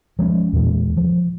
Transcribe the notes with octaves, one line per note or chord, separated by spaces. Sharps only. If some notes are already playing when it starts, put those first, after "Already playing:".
F3 G#3 A3 C#4
E2 A#2 E3 G#3
F3